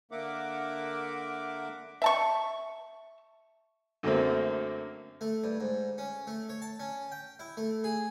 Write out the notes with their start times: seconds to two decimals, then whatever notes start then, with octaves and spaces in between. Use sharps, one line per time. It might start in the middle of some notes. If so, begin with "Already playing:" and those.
0.12 D3 A#3 A#4 E5 F#5 D6
2.02 E5 A5 C#6
4.03 F#2 D3 F#3 A3 A#3 C4
5.21 A3
5.44 G2
5.60 G#2
5.98 C#4
6.27 A3
6.49 C#5
6.62 A5
6.80 C#4
7.12 G5
7.39 E4
7.57 A3
7.84 G#4